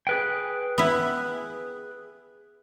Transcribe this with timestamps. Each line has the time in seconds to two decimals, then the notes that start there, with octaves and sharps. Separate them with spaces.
0.07 G#4 B4 G5
0.78 B3 E4